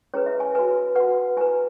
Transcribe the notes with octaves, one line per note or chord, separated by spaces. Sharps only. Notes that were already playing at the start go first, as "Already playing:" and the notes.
C#4 E4 G#4 B4 C#5
E5
G#5
F#4 B4 G#5
F#4 B4 F#5
E4 B4 G#5